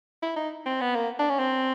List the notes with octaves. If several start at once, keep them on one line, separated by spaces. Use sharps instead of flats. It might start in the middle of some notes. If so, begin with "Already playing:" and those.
E4
D#4
C4
B3
A#3
D4
C#4
C4